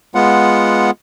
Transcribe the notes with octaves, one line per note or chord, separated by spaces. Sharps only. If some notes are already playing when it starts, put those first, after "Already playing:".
G#3 B3 F4 F#5